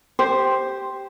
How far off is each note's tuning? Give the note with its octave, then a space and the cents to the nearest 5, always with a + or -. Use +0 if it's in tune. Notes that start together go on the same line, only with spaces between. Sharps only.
G4 +0 C5 +0